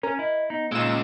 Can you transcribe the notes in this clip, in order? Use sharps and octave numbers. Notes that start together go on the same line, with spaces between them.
C#4 A#4
E4 D#5
B3 D#4
A#2 G#3 C#4 D#4 F4 E6 E7